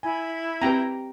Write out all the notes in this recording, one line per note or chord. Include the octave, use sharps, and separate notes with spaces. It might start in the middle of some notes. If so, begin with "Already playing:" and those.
E4 G#5 B5
C4 G4 B4 G5 A#5